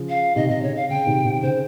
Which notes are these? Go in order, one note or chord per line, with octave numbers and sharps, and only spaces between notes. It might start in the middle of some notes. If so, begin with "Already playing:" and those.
Already playing: C#3 F3
F5
C3 D#3 D#5
C3 D#5
C#3 C#5
F5
C#3 G5
C3 D#3
C3 D#3
C#3 C5